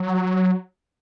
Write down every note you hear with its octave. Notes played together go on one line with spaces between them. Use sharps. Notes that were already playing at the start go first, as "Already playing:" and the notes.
Already playing: F#3